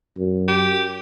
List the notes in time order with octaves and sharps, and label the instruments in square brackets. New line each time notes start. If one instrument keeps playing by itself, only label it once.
[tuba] F#2
[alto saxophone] G4